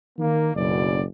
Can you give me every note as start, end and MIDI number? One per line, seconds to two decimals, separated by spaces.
0.19 0.50 51
0.19 0.50 58
0.55 1.02 30
0.55 1.02 35
0.55 1.02 42
0.55 1.02 47
0.55 1.02 74